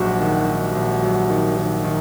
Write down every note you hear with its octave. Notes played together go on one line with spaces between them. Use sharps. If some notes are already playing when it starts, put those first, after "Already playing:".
Already playing: A#1 G#2 F#3 F#4 G4
D#3
D#3
A#1
F#3
D#3
D#3
D#3